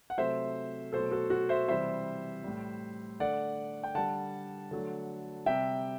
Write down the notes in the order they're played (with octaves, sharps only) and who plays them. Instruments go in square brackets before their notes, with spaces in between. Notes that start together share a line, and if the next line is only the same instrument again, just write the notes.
[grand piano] F#5
C3 F#3 A3 C5 E5
B2 F#3 A3 A4 C5
F#4 A4
F#4
C5 E5
C3 E3 G3 C5 E5
A2 G3
D3 A3 D5 F#5
G5
D3 G3 F#5 A5
D3 F#3 A3
C3 G3 E5 G5